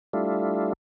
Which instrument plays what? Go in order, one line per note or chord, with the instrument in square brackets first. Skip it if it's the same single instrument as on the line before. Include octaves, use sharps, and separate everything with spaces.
[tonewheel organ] G3 A3 D4 E4 F4